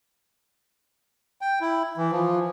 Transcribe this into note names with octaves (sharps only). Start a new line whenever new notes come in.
G5
E4
E3
F3